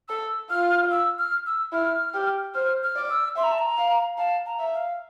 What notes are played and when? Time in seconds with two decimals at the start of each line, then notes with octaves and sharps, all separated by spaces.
0.09 A4 E6
0.50 F4 F6
0.91 E6
1.18 F6
1.46 E6
1.72 E4 F6
2.14 G4
2.54 C5 F6
2.83 F6
2.96 D5
3.10 E6
3.36 E5 C6
3.44 A#5
3.52 A5
3.59 A#5
3.78 F5
4.18 F5 A5
4.46 A#5
4.59 E5
4.73 F5